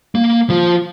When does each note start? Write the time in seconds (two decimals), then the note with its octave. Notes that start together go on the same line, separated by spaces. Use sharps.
0.15 A#3
0.50 F3